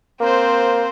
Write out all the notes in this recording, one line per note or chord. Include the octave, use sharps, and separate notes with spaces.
A#3 C4 C5